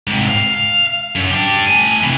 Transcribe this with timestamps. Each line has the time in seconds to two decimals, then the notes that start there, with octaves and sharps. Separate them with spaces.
0.07 G#2 C3
0.29 F5
1.15 F#2
1.31 D4 G4
1.66 A3 G#5
2.02 C3 E3